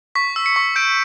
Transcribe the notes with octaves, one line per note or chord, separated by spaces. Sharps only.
C#6 B6
E6
C#7
C#6
G6 D7